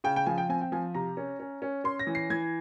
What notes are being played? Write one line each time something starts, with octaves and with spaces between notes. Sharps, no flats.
C#3 G5
G5
F3 G#5
G5
C4 G#5
G5
F3 G#5
C3 A#5
C#4
C#4
C#4
C#4 C6
A#6
E3
C7
E3 G#6